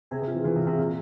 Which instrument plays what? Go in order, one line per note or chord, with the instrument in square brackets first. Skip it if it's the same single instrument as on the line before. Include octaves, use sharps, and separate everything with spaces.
[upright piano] C3 [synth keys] G#4
[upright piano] C3
[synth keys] F4
[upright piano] E3
[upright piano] E3 [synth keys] F4
[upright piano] C3
[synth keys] F4
[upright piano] C3
[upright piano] A#2 [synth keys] F4